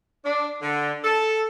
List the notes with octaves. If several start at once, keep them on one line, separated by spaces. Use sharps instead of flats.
D4
D3
A4